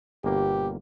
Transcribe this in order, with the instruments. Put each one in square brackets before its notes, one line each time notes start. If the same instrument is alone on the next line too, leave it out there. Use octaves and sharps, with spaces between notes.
[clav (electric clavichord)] G1 B2 A#3 [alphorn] G4